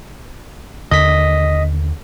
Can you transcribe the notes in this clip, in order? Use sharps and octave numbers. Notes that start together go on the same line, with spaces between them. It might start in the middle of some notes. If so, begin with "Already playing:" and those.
D#2 D3 D#5 B6